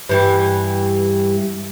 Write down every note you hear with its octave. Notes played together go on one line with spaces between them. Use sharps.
G2 E3 G3